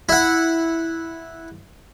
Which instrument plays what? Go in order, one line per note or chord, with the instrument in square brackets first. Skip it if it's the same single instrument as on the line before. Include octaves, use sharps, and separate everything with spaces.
[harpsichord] E4 F#5